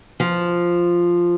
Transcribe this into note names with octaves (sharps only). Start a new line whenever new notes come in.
F3